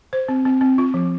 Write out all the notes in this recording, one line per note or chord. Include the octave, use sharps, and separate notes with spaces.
C5
C4
C4
C4
F4
F3